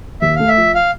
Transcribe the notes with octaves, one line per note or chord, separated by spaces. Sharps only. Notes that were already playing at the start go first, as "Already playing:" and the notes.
D#2 E5
A3 F5
E5
F3
F5